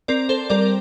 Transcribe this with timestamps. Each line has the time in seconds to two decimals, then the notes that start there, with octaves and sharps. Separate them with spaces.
0.08 C4 A#4 D5
0.29 A4 C5
0.50 G3 A#4 D5